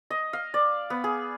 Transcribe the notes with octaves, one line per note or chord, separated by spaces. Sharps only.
D#5
F5
D5
B3
G#4